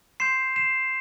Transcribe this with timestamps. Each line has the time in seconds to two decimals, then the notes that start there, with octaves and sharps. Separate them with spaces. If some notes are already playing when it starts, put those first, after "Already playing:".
0.20 C6 G6 C7 E7
0.56 C7 E7